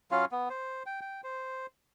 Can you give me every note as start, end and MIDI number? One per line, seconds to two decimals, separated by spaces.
0.11 0.25 54
0.11 0.25 61
0.11 0.25 65
0.11 0.25 77
0.31 0.49 59
0.50 0.83 72
0.86 1.00 79
1.01 1.21 79
1.24 1.66 72